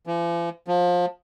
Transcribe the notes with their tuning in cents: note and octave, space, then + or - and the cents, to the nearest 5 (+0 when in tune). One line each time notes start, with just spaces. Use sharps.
F3 -45
F3 +25